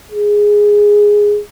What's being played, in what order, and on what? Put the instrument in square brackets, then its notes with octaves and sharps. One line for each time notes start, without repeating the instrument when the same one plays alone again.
[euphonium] G#4